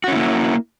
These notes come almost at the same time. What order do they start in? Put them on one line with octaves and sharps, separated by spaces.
F#4 C#4 E4 A#3